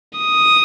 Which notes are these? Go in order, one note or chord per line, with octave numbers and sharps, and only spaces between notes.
D#6